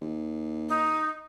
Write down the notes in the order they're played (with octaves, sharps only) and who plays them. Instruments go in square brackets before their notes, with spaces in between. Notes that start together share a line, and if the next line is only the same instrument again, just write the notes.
[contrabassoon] D#2
[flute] D#4